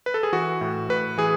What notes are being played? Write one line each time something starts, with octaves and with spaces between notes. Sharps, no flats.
B4
A4
G#4
E3 F#4
A2
A2 B4
E3 G#4